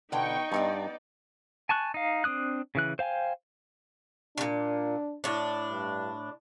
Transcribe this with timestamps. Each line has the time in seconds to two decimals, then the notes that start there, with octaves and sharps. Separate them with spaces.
0.12 B2 D3 E3 D#4 G5 A#5 C#6
0.52 G2 B3 D5 D#5 G5
1.69 G#5 A5 C#6 F#6
1.94 D#4 F5
2.24 C4 D4 D#6 F#6
2.75 C#3 E3 F#6
2.99 C5 F5 G5 G#5
4.38 A#2 C#3 D4
5.24 A2 D4
5.70 G2